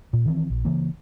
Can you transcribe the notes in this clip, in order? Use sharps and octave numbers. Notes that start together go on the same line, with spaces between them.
A#2
D#3 E3 C4
A#1
C#3 E3 A#3